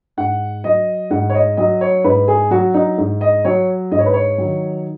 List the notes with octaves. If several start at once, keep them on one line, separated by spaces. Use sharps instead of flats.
G#2 F#5
F#3 D#5
G#2 F#5
C#5
D#5
F#3 D#5
C#5
G#2 B4
G#4
F#3 F#4
D#4
G#2
D#5
F#3 C#5
G#2 D#5
C#5
B4
C#5
D#3 F#3